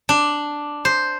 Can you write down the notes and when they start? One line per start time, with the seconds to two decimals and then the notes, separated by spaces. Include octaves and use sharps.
0.09 D4
0.85 C5